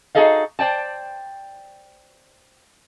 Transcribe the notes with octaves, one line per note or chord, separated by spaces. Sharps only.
D#4 F#4 G#4 A4 D#5 F5
C5 D5 G5 A5